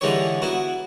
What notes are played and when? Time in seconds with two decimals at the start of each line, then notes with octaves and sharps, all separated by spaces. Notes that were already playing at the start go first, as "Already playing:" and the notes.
0.01 D3 E3 G#3 D#4 G4 C#5
0.42 B3 E4 F#4